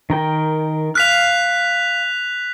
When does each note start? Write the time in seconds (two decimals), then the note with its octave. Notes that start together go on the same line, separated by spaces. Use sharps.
0.10 D#3 A#4 G5
0.95 F5 F6 F#6 B6 F7